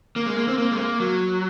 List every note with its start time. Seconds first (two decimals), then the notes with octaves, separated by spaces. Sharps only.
0.16 A#3
0.26 G#3
0.37 A#3
0.48 C4
0.58 A#3
0.72 G#3
0.79 A#3
1.00 F#3